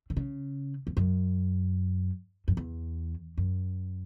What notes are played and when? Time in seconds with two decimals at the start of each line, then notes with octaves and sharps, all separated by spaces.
0.10 D3
0.17 C#3
0.87 E2
0.97 F#2
2.48 F#2
2.57 E2
3.38 F#2